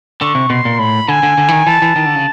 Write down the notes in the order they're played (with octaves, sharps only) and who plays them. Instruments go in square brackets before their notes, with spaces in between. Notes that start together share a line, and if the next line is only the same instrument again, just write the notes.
[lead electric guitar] D3 [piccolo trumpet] C#6
[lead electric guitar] C3
[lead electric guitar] B2 [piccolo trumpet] C6
[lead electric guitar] A#2
[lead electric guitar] A2 [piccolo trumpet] B5
[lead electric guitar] D3 [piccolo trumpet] G#5
[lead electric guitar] D3
D3
E3
D#3
[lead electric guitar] E3 [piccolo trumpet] A5
[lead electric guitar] E3
D#3
D3
C#3